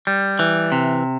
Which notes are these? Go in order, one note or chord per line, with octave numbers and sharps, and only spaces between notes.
G3
E3
C3